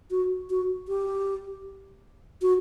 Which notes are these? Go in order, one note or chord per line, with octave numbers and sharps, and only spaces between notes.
F#4
F#4
G4
F#4